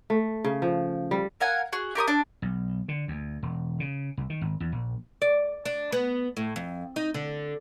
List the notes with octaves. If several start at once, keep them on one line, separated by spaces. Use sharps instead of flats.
A3
C#3
F3
G3
A#4 F5 F#5 G#5
F#4 G#4
G4 A#4 C#6 D#6
D4
B1
D3
D2
E1
C#3
C2
D#3
G#1
E2
A#1
D5
D4
B3
A2
F2
D#4
D3